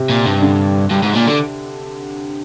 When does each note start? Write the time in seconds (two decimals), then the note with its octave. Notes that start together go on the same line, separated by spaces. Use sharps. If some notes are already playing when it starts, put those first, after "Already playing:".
Already playing: C3
0.09 A#2
0.26 G2
0.42 D3
0.91 G2
1.03 G#2
1.15 A#2
1.27 D3